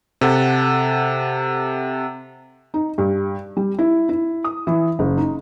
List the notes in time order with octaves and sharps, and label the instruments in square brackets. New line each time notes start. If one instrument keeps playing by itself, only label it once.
[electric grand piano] C3 A4 F#5
[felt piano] D#4
G2
G3
E4
E4
D#6
E3
F#1
D#4